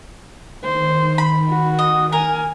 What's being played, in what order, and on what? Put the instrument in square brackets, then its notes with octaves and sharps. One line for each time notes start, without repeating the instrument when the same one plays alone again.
[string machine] D#3 [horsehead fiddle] C5
[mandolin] B5
[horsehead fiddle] F#4
[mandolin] D#5
[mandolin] A#4 [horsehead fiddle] G#5